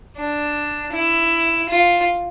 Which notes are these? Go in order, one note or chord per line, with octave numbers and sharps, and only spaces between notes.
D4
E4
F4